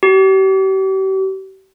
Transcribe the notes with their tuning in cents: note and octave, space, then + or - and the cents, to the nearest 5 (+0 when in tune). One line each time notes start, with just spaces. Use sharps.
G4 -40